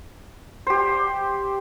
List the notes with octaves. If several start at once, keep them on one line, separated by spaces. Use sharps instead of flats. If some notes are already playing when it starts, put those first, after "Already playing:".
G4 C5